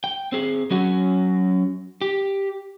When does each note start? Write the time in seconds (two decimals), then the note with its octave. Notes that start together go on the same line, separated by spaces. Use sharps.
0.04 G5
0.33 C4 G#4
0.71 F#3 C#4 F#4
2.01 G4